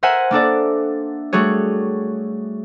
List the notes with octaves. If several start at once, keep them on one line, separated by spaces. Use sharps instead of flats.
A#4 C5 E5 F#5 G#5
A#3 D4 A4 D5
G3 A3 F#4 G#4 C#5